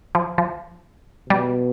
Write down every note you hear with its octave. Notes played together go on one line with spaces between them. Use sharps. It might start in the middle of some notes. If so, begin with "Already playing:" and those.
F3
F3
B2 G3